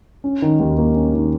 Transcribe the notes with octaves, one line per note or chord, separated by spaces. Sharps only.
C#4
D#3
D#2
A#3
C#4
D#3